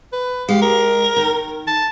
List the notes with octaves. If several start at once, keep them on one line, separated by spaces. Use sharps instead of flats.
B4
G#3 G4 F5
A#4
D#3
A5